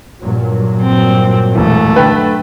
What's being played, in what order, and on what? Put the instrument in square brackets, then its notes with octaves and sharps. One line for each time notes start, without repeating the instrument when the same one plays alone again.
[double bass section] G2 A#2 F#3
[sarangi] C4
[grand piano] E1 E3 [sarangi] A3
[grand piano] D3 B4 G5